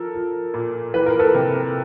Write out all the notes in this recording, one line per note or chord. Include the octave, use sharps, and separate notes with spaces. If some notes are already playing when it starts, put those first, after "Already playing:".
Already playing: F3 A4 A#4
F3
A#2
E3 B4
A#4
A4 B4
C3